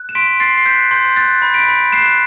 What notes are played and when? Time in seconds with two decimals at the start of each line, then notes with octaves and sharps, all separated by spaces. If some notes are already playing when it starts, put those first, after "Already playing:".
Already playing: F#6
0.09 E7
0.15 C6 B6 D7
0.40 C6 A6 C7
0.57 C7
0.66 F#6 G6 B6
0.91 C6 G6
1.16 F#6 A6
1.42 B5
1.54 B6 D7
1.67 B5
1.92 F#6 C7 E7